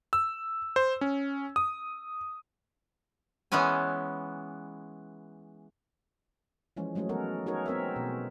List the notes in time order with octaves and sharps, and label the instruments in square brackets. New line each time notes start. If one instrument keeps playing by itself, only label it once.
[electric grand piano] E6
C5
C#4
D#6
[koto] E3 G#3 B3 C#4 G#5
[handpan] E3 F3 G#3 C#4
F#3 G#3 A3 C#4 G#4
G#3 B3 F#4 A4 A#4
D#4 F#4 G#4 A#4 C#5
B3 C4 A#4 C#5 E5
B2